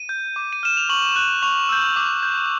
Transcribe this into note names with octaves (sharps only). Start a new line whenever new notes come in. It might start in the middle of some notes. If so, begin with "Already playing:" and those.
Already playing: D#7
G6
D6
D#7
F6 E7
F7
C#6 F#7
F#6
C#6 F7
E6 G6
D6
G6